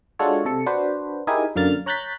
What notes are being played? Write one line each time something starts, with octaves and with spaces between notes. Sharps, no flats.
G#3 D4 F4 F#4 A4 C#5
C3 A4 C#7
D4 F#4 B4 C5
D#4 E4 G4 G#4 A#4 G#5
F#2 D3 A#3 F6 A6
C#5 A#5 F#6 G6 A6 B6